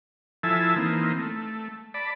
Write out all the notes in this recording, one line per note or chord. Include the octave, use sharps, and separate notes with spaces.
F3 E4 A4 E5 G#5 A5
E3 A#3 C4 D#4
A3
D5 A5 B5